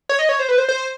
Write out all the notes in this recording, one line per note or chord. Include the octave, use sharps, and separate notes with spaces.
C#5
D#5
C#5
C5
B4
C5
C5